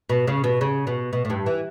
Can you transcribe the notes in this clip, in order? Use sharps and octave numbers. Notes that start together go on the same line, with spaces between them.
B2
C#3
B2
C#3
B2
B2
A2
G2
E3